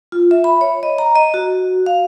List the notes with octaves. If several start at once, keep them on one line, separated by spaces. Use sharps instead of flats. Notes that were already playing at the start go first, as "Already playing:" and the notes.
F4
E5
B5
C#5
D#5
A#5
D#5
F#4
F5